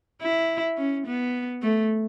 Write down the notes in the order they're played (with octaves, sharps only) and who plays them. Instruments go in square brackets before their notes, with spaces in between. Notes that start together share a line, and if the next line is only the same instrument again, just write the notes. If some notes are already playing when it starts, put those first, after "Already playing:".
[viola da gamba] E4
C#4
B3
A3